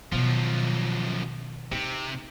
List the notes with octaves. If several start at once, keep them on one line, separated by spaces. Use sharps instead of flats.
F#2 B2 D#3 F3
C3 D#4